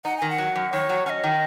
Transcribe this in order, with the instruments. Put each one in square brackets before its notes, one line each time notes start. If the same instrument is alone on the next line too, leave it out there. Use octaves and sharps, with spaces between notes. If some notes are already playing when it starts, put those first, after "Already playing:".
[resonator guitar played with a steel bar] D#4 [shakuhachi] F#5
[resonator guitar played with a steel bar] D#3 [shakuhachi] G#5
[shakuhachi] F#5
[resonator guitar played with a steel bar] F#3
F#2
[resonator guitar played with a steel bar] D#3 [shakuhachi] C#5
[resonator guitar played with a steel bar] F#3
[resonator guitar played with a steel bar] C#4 [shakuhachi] F#5
[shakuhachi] D#5
[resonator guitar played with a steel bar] D#3